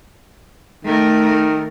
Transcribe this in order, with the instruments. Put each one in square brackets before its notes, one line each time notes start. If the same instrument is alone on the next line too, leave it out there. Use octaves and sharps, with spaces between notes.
[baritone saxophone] D#3 [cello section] A3 A#4